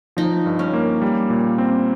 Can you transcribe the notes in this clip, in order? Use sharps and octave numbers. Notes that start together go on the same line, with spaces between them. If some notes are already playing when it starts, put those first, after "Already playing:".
F3 D#4
G2
C#4
A#3
G3
A#2
C4